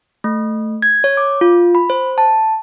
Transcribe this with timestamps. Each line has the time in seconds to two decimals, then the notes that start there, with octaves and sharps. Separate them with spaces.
0.24 A3
0.82 G#6
1.04 C#5
1.17 D6
1.41 F4
1.75 B5
1.90 C5
2.18 A5